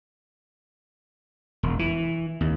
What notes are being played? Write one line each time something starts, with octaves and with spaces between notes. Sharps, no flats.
E1
E3
D#2